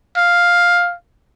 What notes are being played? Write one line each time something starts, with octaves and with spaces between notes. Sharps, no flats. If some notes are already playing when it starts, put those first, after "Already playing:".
F5